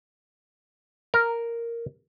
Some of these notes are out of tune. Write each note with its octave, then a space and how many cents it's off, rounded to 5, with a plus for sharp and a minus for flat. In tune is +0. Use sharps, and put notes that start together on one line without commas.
A#4 -5